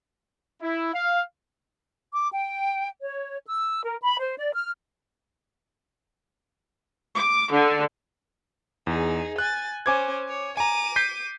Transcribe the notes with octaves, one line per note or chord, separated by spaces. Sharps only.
E4
F5
D6
G5
C#5
E6
A#4
B5
C5
D5
F6
D6
D3
E2 D#4 G#4
G#5 F#6 A6
C#4 C5 G#5 D6 G#6
C#5
G#5 A#5 D6 D#7
G6 B6 C7